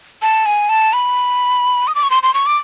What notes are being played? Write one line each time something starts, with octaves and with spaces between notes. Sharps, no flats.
A5
G#5
A5
B5
D#6
D6
C#6
C6
C6
C#6
D6